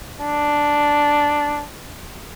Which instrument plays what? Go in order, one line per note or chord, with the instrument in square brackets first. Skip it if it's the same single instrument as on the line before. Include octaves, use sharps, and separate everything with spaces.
[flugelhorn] D4